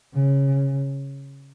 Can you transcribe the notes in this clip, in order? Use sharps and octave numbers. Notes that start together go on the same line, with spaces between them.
C#3